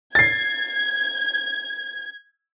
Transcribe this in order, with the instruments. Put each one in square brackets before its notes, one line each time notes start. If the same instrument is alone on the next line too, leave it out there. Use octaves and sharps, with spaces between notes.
[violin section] G#6 [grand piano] A6 C7